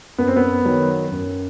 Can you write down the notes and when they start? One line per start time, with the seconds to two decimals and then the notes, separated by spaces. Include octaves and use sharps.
0.18 F#2 B3
0.28 C4
0.36 B3
0.65 D#3 F#3
1.12 F#2